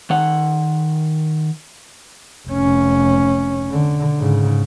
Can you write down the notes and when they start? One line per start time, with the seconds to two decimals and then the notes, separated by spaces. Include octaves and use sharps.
0.10 D#3 F#5
2.48 F1 C#4
3.71 D3
4.18 G#2 C#3